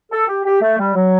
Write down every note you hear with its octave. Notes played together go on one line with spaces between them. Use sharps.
A4
G4
G4
A3
G3
F#3